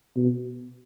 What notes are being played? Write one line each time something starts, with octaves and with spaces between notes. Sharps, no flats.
B2